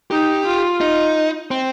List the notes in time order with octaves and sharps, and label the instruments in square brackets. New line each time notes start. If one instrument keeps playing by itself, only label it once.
[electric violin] D#4 [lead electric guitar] G4
[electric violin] F4
[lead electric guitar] D#4
C4